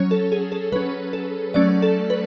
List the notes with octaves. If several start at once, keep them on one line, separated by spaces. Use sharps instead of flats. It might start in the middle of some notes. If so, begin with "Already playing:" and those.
Already playing: F#3 C#4 C#5
A4
G#4
A4
F#3 C#4 B4
A4
F#3 A3 C#4 D5
A4
B4